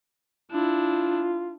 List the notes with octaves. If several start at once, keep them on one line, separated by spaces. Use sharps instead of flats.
D4 E4 F4